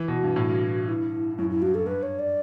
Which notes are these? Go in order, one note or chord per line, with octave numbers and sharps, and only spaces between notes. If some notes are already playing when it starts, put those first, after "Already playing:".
Already playing: E3
B2
F#4
G2
A2
G2
E4
F#2 E4
E4
G2 F#4
A4
G2 B4
C#5
D5